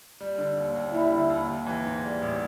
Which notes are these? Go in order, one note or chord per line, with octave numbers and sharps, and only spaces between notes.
G3
D3
D#2
D#2
G3 E4
D3
D#2
D#2
E3
G#2
G3
A1